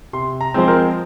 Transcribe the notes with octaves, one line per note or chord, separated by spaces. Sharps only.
C3 C6
A#5
F3 G#3 C4 C5
A#4